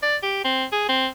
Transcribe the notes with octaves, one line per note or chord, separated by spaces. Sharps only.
D5
G4
C4
G#4
C4